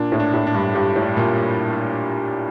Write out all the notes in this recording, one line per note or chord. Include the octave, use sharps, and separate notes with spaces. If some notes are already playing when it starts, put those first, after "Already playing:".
Already playing: A#2 D4
A2
D4
A2
D4
G2
G2 G4
A2
G3
A#2